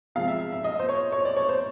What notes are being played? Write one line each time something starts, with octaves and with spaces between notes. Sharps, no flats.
C3 F3 G#3 F5
E5
E5
D#5
C5
C#5
C#5
D5
C#5
C5